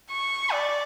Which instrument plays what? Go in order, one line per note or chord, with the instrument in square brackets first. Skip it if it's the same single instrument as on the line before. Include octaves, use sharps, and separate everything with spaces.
[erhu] C#6
D5